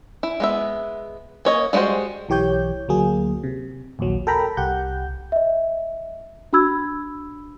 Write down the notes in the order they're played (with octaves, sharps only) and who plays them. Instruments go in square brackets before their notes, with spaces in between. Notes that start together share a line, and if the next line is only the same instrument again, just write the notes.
[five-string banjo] E4
G#3 B3 E5
A#3 C#5 D#5
G3 G#3 C4 F#4 C5
[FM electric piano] B1 E3 G4 C#5 G6
D2 F#3 A#3 G#4
C3
A#1 D#2 F#3
A4 A#4 G5 A#5 B5
C2 G4 F#5 G6
[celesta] D#5 E5
D4 F#4 B5 E6 G#6